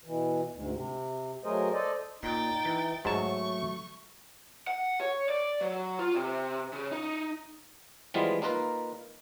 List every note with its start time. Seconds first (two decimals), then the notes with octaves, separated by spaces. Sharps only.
0.04 B2 E3
0.53 D2 G#2
0.73 C3
1.44 F#3 A3 G#4 A#4 C5 D#5
1.73 A4 C5 D5 D#5
2.23 A#2 D#4 G5 A6
2.65 E3
3.05 G#2 F#3 A3 A5 C#6
4.67 F#5
5.01 C#5
5.29 D5
5.61 F#3
5.99 F4
6.15 C3
6.73 C#3
6.92 D#4
8.14 E3 F3 G3 G#3 B3 F4
8.42 A#3 D#4 F4 A#4 B4